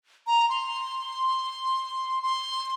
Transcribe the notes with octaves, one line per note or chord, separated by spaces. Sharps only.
A#5
C6
C6